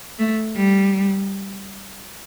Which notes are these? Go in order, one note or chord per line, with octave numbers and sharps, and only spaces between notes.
A3
G3